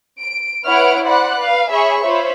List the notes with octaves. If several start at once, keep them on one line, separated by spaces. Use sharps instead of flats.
D7
E4 B4 C#5 F#5 F6 D7
C5 D5 F#5 B5 F#6
B4 F5
G#4 C#5 E5 B5 C#6
F4 C5 C#5 E5 B5